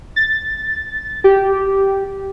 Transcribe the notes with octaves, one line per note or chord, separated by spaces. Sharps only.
A6
G4